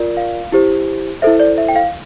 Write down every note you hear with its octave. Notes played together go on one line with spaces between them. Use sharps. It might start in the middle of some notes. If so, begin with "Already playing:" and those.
Already playing: F4 A#4 D5
F5
E4 G4 C5
E4 A4 C5 E5
D5
E5
G5
F5